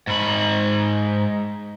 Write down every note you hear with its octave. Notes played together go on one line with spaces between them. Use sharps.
G#2 B5